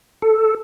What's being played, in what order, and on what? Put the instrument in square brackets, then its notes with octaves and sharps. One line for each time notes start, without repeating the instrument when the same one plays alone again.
[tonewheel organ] A4